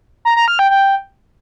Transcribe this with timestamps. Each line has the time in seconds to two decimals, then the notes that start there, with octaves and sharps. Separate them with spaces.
0.25 A#5
0.36 A#5
0.48 F6
0.59 G5
0.70 G5